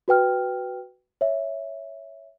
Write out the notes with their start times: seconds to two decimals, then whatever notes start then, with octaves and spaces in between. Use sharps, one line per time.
0.08 F#4 B4 G5 F6
1.21 C#5 E5